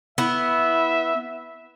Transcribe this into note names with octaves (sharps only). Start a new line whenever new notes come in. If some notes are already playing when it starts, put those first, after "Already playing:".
B3 E4 E5